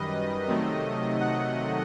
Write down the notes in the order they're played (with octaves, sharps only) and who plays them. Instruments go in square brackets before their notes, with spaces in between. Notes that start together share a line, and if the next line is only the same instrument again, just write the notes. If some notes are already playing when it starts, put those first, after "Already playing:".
Already playing: [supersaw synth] F#2 D#3 G3 B4 D#5
C3 D#3 F#3 A3
F#5